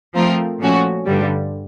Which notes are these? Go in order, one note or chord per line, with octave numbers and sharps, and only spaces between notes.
F3 A3 C4 F4 A#4
A#2 F3 A3 C#4 F#4
G2 D3 G3